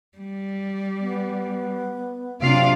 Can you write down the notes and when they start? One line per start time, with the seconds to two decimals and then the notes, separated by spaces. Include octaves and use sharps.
0.18 G3
1.01 B3
2.41 C3 F#3 D4 F4 F5